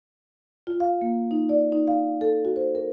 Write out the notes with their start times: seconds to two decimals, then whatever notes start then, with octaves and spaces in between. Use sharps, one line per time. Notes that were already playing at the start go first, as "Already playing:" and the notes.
0.67 F4
0.80 F5
1.01 A#3
1.31 D#4
1.49 D5
1.72 D#4
1.87 F5
2.21 A4
2.45 F#4
2.56 C5
2.75 A#4